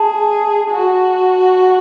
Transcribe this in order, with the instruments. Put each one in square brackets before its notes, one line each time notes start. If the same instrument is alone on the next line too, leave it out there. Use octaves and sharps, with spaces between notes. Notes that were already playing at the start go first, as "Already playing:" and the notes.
Already playing: [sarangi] G#4 [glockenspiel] A5
[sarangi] F#4